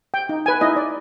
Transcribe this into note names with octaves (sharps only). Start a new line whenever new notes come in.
G5
D#4
B4 G#5
D#4 E4 D#5
D5